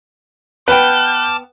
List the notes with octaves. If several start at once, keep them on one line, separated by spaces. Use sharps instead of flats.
B3 B4 G5 A5 D6 F6 G6